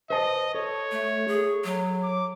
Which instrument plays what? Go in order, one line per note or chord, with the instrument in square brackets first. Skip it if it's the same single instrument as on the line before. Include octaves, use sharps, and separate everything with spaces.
[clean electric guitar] B4 C5 A5 [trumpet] D#5
[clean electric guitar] A4 [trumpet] C#5
[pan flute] A3
G#4
F#3
[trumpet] D6